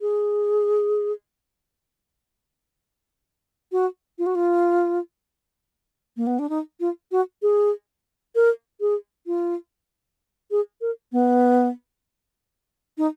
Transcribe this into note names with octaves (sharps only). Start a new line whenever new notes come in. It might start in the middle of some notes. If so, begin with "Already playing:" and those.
G#4
F#4
F4
F#4
F4
A#3
B3
D4
D#4
F4
F#4
G#4
A#4
G#4
F4
G#4
A#4
B3
D#4